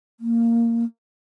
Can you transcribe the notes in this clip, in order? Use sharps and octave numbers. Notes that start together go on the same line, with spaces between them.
A#3